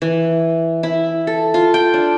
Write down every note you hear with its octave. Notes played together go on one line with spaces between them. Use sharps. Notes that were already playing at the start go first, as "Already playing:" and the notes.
E3
E4
A4
F4
G5
D4